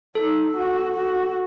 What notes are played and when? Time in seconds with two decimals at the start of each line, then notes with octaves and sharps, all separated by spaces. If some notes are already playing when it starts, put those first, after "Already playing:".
0.15 D#4 A4
0.57 F#4
0.97 F#4